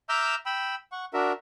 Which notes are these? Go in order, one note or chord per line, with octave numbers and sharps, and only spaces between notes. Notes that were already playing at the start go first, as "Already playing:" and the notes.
E5 A#5 D6 E6 F6 G6
G5 B5 E6
F#5 C#6
D4 F#4 A#4 E5